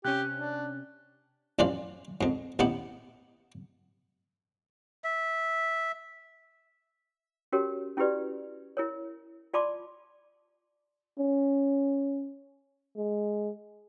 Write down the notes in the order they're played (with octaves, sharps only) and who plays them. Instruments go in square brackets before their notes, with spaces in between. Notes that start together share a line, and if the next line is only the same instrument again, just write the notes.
[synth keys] C3 C#4 [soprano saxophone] G4 [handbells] F#6
[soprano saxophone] D4
[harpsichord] A1 F#2 E3 F3 F4 D5
F2 G#2
A1 D#2 B3 D#4 E4 G4
[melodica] E5
[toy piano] C#4 F#4 G4 A#4 C#5
C#4 E4 F#4 G4 B4 D5
E4 A#4 C#5
F4 D5 A5 B5 C6 D6
[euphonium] C#4
G#3